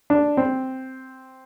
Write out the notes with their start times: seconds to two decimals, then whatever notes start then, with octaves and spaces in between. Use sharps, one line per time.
0.10 D4
0.37 C4